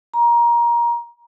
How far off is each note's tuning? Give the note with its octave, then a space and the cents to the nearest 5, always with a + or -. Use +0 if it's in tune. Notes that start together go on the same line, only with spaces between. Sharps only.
A#5 +20